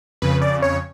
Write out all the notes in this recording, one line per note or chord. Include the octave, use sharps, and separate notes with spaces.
F2 C#3 B4
D5
C#5